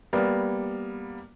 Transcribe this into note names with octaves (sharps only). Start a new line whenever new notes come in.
G3 A#3 B3